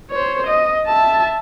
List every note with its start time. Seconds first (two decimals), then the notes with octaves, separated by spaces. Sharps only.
0.11 C5 C#5
0.47 D#5
0.87 E5 A5